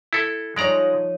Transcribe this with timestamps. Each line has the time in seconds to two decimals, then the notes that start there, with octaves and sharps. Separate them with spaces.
0.13 E4 A4
0.56 F3 G#3 D#4 C#5 D5 A#5